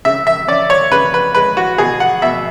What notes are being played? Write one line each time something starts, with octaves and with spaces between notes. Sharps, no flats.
C#3 E5
E5
C#4 D5
C#5
C#3 B4
B4
G#3 B4
F#4
B2 G#4
F#5
B2 E5